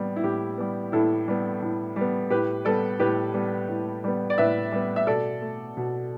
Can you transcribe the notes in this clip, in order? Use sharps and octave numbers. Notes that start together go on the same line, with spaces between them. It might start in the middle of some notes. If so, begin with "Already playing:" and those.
Already playing: A2 G3 B3
E4
A2 G4
G3 B3
A2 E4 A4
G3 B3
A2
G3 B3
A2 G4 B4
G3 B3 A4 D5
A2 G4 B4
G3 B3
A2
G3 B3
D5
A2 B4 E5
G3 B3
E5
B2 A4 D5
A3
B2